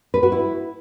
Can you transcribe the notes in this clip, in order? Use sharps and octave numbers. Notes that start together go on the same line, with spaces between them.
B4
F#4
E4